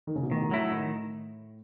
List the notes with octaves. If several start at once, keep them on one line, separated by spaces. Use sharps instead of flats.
D#3
C#3
B2
A1 A2 D#3
F#3 A3 E4
A2 D#3